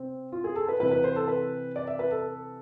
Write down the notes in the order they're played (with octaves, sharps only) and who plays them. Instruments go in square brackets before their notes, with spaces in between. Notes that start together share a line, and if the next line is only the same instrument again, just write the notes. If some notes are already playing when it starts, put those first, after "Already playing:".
Already playing: [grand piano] C3 C4
F4
G#4
A4
B4
C3 E3 B4
B4
C5
A4
B4
D5
E5
B4
A4